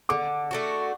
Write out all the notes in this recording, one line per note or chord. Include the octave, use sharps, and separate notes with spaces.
D3 D6
A3 D4 F#4